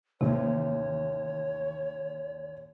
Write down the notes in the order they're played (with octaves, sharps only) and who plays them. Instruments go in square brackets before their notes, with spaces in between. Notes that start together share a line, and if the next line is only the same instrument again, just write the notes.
[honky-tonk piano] A1 D#2 [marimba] C3 [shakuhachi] C#5